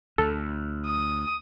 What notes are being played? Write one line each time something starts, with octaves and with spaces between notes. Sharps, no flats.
D2 A4
D#6